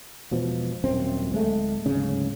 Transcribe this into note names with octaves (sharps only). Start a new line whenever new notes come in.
E1 B2 F3
D#1 F#2 C4
D1 G#3 A3
D1 G#2 C#3 C#4